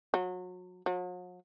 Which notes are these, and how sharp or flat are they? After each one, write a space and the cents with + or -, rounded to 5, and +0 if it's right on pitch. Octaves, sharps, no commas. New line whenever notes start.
F#3 -30
F#3 -45